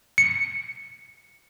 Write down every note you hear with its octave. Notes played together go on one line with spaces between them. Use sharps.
C#7